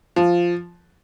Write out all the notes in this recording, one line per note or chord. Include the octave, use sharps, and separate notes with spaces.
F3